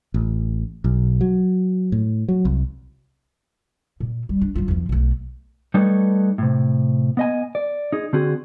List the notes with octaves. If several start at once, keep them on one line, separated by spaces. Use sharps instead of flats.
A1
B1
F#3
A2
F#3
C2
A#2
G3
D4
F#3 F4
E2 F3
B1 A3
G3 A3 D#4 A4 B4 C#5
A2 C3
B3 D#5 G#5
D5
D#4 G#4
D3 C4 F#4 G#4